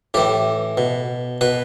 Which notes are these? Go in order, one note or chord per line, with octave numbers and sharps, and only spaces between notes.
A2 E3 G4
B2
B2 B4